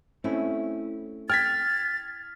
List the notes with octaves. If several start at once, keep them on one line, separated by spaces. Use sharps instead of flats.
A3 C4 C#4 E4
G5 F6 G#6 A6 B6